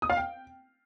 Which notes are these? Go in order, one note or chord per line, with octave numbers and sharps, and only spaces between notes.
D#6
F5
G5